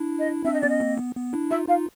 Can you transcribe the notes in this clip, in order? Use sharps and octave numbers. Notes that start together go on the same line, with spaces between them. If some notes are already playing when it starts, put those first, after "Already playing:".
Already playing: D4 E4
D#5
C4 D4 E5
D#5
B3 C#4 D5
D#5
A#3 C4
B3
B3
D4 E4
D#4 F4 E5
D#4 F4 F5